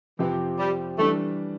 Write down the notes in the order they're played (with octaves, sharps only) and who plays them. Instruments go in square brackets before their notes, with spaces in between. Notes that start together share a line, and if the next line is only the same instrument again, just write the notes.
[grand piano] F2 C3 F3 C4 G4 [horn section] E3
[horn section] G3
[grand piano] E3 G3 D4 [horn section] A3